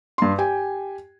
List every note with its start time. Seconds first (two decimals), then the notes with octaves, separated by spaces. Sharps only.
0.18 G2 C6
0.38 G4 G5 G#5